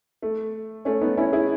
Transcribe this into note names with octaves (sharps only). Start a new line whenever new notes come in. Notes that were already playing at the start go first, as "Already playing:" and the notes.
A3
A3 C#4
B3 D#4
C#4 E4
E4 G#4